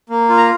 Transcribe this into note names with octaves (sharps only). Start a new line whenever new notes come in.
A#3
F4
A#5